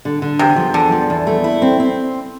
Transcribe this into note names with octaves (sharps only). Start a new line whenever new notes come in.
D3
D3
E2 C3
F3
E2 D3
F3
E2
A3
E4
C4
C4